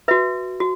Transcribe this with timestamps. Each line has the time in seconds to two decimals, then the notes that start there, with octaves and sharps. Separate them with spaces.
0.08 F#4 B4 E5
0.60 F#4